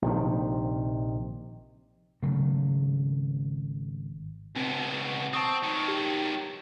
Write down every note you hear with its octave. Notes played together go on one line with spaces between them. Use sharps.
A#1 C3 D#3
G#1 C#3 F#3 A3
C#2 B2 C4
C4 A5 C#6 D#6
D#3 F#3
G4